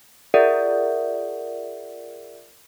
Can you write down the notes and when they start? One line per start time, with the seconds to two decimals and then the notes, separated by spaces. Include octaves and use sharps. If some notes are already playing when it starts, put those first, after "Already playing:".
0.34 F4 G#4 A#4 D5 E5 F#5